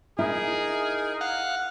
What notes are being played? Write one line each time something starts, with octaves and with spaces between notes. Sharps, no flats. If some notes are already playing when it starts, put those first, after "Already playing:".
D#4 E4 G#4 A#4
F5 F#5